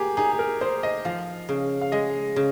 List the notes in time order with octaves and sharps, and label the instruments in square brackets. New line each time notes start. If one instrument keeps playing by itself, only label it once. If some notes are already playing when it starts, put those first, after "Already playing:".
Already playing: [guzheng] A#3 [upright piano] G4 G#4
[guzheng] D#4 [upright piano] G#4
[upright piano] G#4
A#4
[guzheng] D#4 [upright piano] C5
[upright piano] D#5
[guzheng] F3 [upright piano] F5
[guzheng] C#3
[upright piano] F5
[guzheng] G#3 [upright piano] D#5
[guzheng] C#3